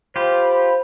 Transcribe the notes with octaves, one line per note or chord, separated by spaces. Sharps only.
F4 G4 C5 B5